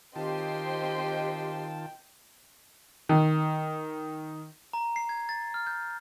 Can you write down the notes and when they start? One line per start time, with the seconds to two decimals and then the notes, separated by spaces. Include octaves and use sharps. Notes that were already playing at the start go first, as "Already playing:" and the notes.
0.16 D#3 C4 F4 G4 D#5 G5 A5 C6
3.09 D#3
4.73 A#5
4.96 C7
5.09 G#6
5.29 A6
5.54 F6
5.67 G6